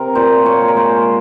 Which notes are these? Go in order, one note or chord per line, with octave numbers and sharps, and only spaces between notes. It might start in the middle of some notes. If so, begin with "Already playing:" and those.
Already playing: C3 A#4
A#2 C5
C#5
G#3
A#4
C5